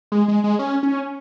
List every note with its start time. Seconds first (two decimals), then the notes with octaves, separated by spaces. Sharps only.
0.12 G#3
0.28 G#3
0.44 G#3
0.59 C#4
0.83 C#4